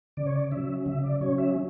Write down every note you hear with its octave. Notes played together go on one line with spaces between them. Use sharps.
C#3 D5
C#5
D5
F#3 C#4 E5
C#3 E5
D5
F#3 C#4 C#5
E5